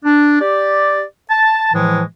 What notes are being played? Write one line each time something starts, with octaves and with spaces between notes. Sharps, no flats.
D4
G4 D5
A5
A2 E3 F3 G#3